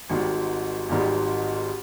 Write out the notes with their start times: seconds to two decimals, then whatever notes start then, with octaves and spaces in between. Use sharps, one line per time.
0.10 G#1 G#2 D#3 G3
0.89 G#1 G#2 D#3 G3